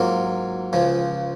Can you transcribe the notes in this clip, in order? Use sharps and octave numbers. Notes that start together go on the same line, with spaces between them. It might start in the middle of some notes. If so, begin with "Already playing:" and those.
Already playing: G#2 F#3 A#3 F4
C#2 C#3 F3